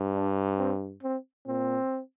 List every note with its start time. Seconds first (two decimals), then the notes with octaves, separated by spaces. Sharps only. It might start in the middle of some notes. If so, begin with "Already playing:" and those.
Already playing: G2
0.15 D4
0.58 C4
1.03 C4
1.47 A#2 C4